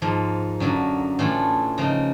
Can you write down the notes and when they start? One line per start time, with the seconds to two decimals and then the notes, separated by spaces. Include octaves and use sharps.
0.02 G#2 F3 A#3
0.60 F#2 D3 F#3 A#3
1.19 A2 E3 A3 D4 F4
1.78 C#3 F3 A#3 D#4